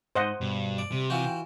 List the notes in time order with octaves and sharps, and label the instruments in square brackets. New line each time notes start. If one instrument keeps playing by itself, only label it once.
[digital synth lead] G#2 [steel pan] C5 D#5 F#5
[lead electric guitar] G2 [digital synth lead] B2
[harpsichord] D5
[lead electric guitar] C3 [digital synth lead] G3
[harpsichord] E3 F4 F#4 [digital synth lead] G5